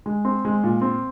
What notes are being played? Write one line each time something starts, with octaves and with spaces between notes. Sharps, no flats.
G#3
C4
G#3
A#2
C4